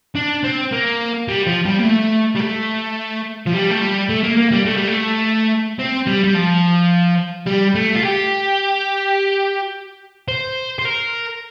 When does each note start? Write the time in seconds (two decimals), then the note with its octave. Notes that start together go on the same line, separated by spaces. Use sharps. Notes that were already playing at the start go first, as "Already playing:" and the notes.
0.15 D4
0.43 C4
0.72 A#3
1.28 G3
1.46 F3
1.65 G3
1.79 A#3
1.84 A3
2.36 G3
2.40 A3
3.46 F3
3.53 G3
3.70 A3
3.81 G3
4.09 A3
4.24 A#3
4.37 A#3
4.52 G3
4.66 A3
4.77 G3
4.88 A3
5.79 C4
6.07 G3
6.24 G3
6.35 F3
7.47 G3
7.75 A3
7.96 F4
8.03 G4
10.28 C5
10.79 C5
10.85 A#4